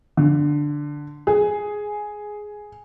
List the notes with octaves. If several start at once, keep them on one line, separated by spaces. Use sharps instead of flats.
D3
G#4